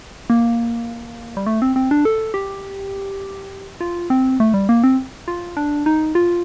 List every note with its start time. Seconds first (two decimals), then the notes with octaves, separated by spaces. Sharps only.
0.30 A#3
1.37 G3
1.46 A3
1.62 C4
1.76 C4
1.91 D4
2.05 A4
2.34 G4
3.81 F4
4.10 C4
4.40 A3
4.54 G3
4.69 A#3
4.84 C4
5.28 F4
5.57 D4
5.86 D#4
6.15 F4